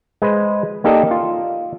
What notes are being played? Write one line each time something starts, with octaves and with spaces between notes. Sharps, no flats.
G#3 B4 C5
A#3 D#4 G4 A4 D5 D#5
F4